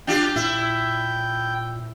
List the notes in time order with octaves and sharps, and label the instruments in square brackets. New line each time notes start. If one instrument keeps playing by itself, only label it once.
[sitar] D4 F4 G4 [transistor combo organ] G5
[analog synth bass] A#2 [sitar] E4